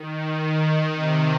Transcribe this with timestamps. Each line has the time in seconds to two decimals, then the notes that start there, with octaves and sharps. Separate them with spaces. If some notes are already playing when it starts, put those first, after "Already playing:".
Already playing: D#3
0.21 D#3
0.95 C3